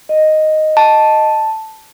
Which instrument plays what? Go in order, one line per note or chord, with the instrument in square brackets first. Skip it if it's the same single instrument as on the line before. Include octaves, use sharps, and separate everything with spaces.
[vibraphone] D#5
[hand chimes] A5